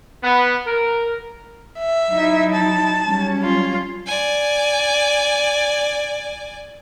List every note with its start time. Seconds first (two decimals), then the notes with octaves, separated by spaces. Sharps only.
0.24 B3
0.67 A#4
1.79 E5
2.10 F#3 D#4 E4
2.53 A5
3.04 F#3 G3 C#4
3.43 F4
4.07 D5 G#5